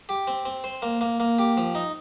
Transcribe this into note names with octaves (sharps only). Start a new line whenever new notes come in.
G4
C4
C4
C5
A#3
A#3
A#3
G4
F3
D#4